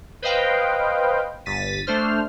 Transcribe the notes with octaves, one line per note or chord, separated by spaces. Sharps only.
B4 C5 D#5 F5 G5
G1 A6 B6 D#7
A3 D4 C5 F6